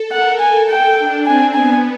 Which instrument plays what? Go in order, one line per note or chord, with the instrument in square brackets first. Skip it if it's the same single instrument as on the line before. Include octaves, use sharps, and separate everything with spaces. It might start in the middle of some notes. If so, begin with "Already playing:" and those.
Already playing: [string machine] A4
[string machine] A#4 [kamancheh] F#5
[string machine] A4 [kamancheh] G#5
[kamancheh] G5
[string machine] D4
[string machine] C4 [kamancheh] G#5
[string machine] B3 [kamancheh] G#5